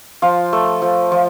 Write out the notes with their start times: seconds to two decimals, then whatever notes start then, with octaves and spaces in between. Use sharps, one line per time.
0.22 F3 F4
0.53 A3
0.82 F3
1.12 F3